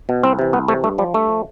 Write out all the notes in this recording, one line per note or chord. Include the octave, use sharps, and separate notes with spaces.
B2
C2 C4
C3 E3
C2 B3
C3 E3 A3
G2 A3
F3 G3
G2 A3
F3